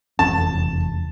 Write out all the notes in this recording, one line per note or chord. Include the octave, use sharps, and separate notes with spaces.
F1 E2 C#4 A5